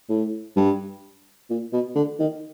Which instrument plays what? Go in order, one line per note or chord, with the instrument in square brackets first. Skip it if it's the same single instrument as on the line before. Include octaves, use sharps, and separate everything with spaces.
[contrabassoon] A2
G2
A#2
B2
D3
D#3